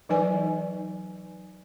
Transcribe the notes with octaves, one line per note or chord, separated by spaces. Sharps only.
E3 F#3 D#4 B4 D5 G#5